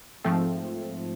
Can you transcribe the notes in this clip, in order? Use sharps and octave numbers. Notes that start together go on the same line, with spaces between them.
G#2 F3 A3 C4